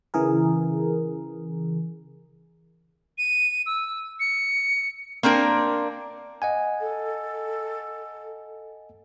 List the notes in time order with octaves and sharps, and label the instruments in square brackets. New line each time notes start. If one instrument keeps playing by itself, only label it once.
[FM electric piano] C#3 E3 G#4 A#4
[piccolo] D#7
E6
C#7
[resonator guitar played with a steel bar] A#3 C4 D4 A#4
[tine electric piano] D#5 F#5 G#5
[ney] A4